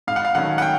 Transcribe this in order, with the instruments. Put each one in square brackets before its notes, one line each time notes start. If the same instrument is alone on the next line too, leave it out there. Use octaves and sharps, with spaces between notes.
[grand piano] G#2 F5
F#5
F5
D#3 F#3 A3 C#4 F#5
F#5
G5